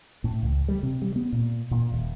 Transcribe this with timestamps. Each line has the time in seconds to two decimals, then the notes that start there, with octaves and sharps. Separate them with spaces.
0.24 A2
0.43 C#2
0.68 G3
0.83 C3
1.02 G3
1.16 B3
1.32 A#2
1.71 A#2
1.92 D#1